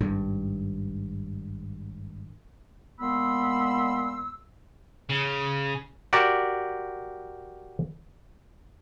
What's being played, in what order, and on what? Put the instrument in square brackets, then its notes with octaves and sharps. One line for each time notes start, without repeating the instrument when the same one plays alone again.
[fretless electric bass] G#1 G2
[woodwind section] A#2 G#3 B3 B5 C6 E6
[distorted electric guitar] C#3
[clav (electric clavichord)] F#4 G4 A#4 D5